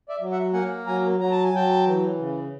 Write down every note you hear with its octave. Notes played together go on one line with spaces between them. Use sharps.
D5 E5
F#3
E5 F#5
A#3 F#5 G#5
F#3 G#5 A#5
F#3 A#5
A5
G#5
F#3 G5 A5
E3
C#3